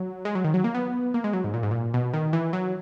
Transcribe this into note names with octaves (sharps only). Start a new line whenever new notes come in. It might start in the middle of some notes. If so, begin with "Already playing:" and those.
Already playing: F#3
G#3
F#3
D#3
F#3
A#3
B3
A#3
G#3
F#3
G#2
A#2
G#2
A#2
B2
D#3
E3
F#3